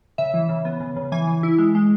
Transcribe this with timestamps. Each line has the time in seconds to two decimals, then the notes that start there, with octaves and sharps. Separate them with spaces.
0.18 C#3 E5
0.34 E3
0.49 C#3
0.65 B3
0.80 C#3
0.96 C#3
1.12 E3 G#5
1.27 E3
1.43 E4
1.58 G#3
1.75 G#3